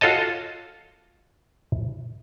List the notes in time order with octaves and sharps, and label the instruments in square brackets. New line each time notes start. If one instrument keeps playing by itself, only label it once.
[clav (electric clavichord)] F4 F#4 A4 C#5 D#5 A5